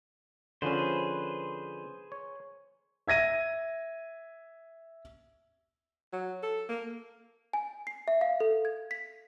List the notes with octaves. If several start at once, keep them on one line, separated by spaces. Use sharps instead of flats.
D3 F3 C#4 G#4 B4 C5
C#5
E5 G#6 A#6 D#7
F#3
A4
A#3
G#5
C7
E5
F5
A4
G#6
B6